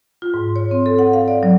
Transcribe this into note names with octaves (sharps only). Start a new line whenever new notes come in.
F4
G#2
C#5
C4
A4
F#5
F5
D5
F#3